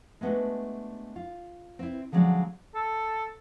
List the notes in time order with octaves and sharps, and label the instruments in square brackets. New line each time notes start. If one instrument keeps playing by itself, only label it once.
[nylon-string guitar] G#3 A3 B3 C#4 D4 F#4
F4
C4 E4
D3 F3 F#3 G#3 C#4 D4
[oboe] A4